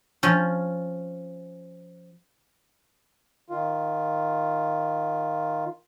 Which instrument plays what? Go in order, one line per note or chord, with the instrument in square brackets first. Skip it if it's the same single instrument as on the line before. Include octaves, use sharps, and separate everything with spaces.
[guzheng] F3 C#4
[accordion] D#3 F4